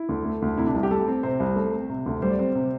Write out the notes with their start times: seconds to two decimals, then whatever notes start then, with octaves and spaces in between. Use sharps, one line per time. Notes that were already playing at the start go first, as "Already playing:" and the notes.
Already playing: E4
0.09 D2
0.25 A3
0.42 D2
0.58 C3 E4
0.67 D4
0.74 C2 E4
0.83 G4
0.91 A3 A4
1.08 C4
1.23 C3 C5
1.40 C2
1.56 A3
1.73 C4
1.89 C3
2.06 D2
2.22 G3 C5
2.30 D5
2.39 C4 C5
2.55 C3